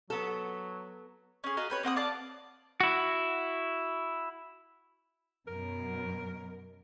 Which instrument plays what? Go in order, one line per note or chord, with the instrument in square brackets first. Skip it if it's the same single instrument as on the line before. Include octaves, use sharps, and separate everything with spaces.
[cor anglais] F#3 [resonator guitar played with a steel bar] B3 A4
[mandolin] C#4 G#4
F#4 D#5 F5 A#5
G4 B4 C#5
A#3 C4 F#5 D#6
D5 F5 A5 D6
[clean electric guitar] E4 F#4
[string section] F#2 B2 [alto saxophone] A#4